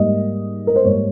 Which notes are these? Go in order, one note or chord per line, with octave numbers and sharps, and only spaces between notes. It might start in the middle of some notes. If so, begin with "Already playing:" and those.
Already playing: G#2 G3 A#3 D#5
A#4
C5
G#2 G3 A#3 C#5